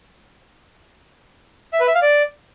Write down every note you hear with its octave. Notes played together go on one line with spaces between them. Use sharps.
E5
B4
E5
F5
D5